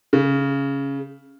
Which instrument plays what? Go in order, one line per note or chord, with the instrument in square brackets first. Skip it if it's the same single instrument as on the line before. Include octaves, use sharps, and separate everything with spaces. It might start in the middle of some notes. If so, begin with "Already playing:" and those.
[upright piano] C#3